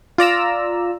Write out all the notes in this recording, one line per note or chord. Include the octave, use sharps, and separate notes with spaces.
F4 D5 A#5 E6